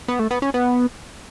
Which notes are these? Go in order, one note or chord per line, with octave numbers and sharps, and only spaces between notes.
B3
A3
B3
C#4
B3